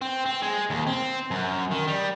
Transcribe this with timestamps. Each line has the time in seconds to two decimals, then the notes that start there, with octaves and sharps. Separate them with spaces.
0.01 C4
0.26 C4
0.42 G#3
0.70 D#2
0.87 C4
1.31 F#2
1.71 D#3
1.87 G3